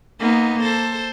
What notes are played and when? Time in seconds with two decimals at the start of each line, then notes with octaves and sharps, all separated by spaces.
0.20 A#3 B3 D#4
0.63 A4 C5